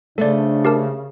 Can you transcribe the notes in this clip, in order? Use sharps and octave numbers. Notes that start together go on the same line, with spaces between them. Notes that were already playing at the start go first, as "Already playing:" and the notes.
C#3 A3 D4 A4 B4 C5 D5
G4 A#4 A5